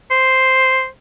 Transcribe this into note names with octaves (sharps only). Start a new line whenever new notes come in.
C5